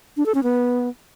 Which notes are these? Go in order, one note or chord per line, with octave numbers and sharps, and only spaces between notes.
D4
A4
C#4
B3